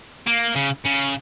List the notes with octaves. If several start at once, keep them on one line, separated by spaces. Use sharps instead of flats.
A#3
C#3
C#3